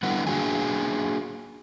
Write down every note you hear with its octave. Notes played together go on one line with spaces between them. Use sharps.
D3 G3 B3 E4 F#5
A#3 D4 F#4 G#4 G#5